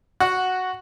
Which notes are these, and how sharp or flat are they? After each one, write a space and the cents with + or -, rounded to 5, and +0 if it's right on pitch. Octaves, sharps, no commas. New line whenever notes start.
F#4 +0 F#5 -5